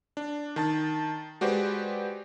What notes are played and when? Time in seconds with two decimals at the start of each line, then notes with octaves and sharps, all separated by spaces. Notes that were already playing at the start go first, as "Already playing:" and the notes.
0.17 D4
0.56 D#3 A5 A6
1.41 G#3 F#4 G4 B4 C5 D5